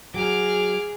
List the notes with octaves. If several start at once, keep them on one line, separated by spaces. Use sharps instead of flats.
F#3 G#4 D6 F6